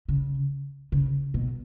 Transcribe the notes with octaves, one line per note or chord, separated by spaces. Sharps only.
C#3
C#3
B2